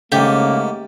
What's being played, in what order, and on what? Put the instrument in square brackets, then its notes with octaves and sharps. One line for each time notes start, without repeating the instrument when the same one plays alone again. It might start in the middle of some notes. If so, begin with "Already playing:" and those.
[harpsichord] G#2 A3 [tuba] C#3 [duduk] A#3 [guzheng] G4